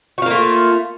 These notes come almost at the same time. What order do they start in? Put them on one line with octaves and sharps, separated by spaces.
F#4 F4 A#3 A3